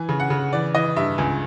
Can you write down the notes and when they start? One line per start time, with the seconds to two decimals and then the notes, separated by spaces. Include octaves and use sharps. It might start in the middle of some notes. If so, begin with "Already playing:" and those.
Already playing: E3 G#5
0.09 C#3
0.20 F#5
0.30 C#3
0.53 E3 D5
0.75 E3 D#5
0.96 G2 E5
1.18 C#2 G#5